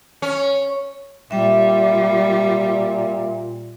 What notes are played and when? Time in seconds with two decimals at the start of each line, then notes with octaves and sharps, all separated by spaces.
0.22 C#4
1.31 A#2 G3 E5 G5